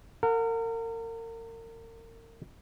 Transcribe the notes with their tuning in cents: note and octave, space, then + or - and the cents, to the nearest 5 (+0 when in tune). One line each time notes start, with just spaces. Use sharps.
A#4 -35 F#5 -35